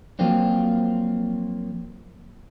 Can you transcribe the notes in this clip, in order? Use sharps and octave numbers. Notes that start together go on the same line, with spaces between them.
F3 F#3 A#3 C4 D4